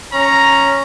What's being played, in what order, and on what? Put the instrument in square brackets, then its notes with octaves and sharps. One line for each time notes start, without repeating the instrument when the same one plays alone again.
[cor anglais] C#4 [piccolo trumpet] A#5